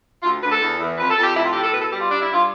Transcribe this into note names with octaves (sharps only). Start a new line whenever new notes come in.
D2 F4
D2 B4
A4
E2
E2
F2 B4
A4
F2
G4
A2 E4
F4
A2 G4
A4
B2 B4
A4
G3 G4
F4
G2 D4
E4
G2
F4